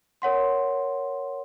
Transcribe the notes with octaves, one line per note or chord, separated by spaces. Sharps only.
A#4 C#5 F#5 C6